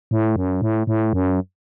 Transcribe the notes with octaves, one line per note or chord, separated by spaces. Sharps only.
A2
F#2
A2
A2
F#2